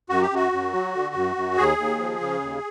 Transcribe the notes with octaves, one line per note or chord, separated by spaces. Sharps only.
F#2 F#4
G4
F#2 F#4
F#2
F#3
D3
F#2
F#2
D#2 G#4
D#2
F3
C#3
D#2